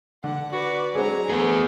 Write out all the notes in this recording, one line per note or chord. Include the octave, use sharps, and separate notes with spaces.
D3 F#5
F#4 B4 D5
F#3 G#3 C4 D4 G#5 A#5
A3 B3 F#4 G#4 B4